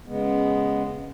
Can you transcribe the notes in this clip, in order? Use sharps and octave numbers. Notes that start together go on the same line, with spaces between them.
C#3 G#3 B3